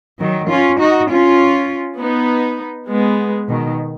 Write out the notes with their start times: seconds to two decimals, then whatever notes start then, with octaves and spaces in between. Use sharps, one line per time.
0.19 D#3 F#3
0.49 C#4 F4
0.79 D#4 F#4
1.10 C#4 F4
2.00 B3 D#4
2.89 G#3 B3
3.49 B2 D#3